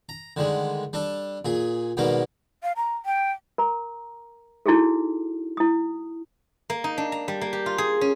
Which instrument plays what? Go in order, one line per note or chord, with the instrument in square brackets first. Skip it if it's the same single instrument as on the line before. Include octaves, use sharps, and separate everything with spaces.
[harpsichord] A#5
D3 D#3 G3 G#3
G3 D4 A4
A#2 G#4
G#2 B2 D#3 G3 A#3 A#4
[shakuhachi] F5
A#5
G5
[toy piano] A#4 A#5
D#4 E4 F#4 G#4 A4
E4 D#6
[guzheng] A#3
D#4
D4
A#5
G3
A#3
G4
F4
G#4
C#4